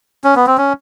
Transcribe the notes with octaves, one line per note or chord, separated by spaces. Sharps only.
C#4
B3
C4
C#4